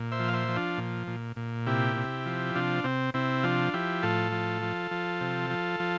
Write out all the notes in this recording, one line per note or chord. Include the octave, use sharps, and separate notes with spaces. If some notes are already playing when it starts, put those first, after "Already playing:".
Already playing: A#2
C5 E5
F3
F5
C5 E5
F3
D4 F4
A#2
A#2
A#2
C3 E4 G4
C3
F3
C3 D4 F4
C3 C4
C3 C4 E4
F3 D4 F4
F3 E4 G4
A2 F4 A4
F3
F3
F3
C3
F3
F3